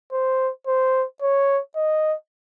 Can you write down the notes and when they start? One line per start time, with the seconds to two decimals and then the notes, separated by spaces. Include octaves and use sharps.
0.12 C5
0.67 C5
1.22 C#5
1.76 D#5